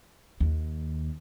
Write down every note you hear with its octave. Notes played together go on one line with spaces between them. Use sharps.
D#2